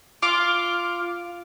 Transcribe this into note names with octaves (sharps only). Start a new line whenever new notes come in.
F4 D6 F6